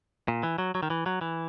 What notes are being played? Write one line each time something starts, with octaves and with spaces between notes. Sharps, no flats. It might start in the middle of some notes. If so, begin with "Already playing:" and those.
A#2
E3
F#3
F#3
D#3
E3
F#3
E3